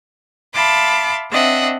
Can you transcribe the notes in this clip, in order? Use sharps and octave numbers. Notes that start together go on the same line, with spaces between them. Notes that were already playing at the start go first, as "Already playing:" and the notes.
E5 F5 A5 B5 C6 D6
C4 D4 D#5 E5 F#5